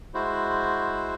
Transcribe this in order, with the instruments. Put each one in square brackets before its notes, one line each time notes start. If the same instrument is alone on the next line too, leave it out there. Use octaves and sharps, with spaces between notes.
[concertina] G#3 E4 F#4 C5